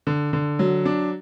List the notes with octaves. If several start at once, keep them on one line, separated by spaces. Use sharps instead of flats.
D3
D3
F#3
D4